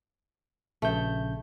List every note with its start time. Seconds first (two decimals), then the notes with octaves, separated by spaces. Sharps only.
0.82 A#1 C#3 A3 G6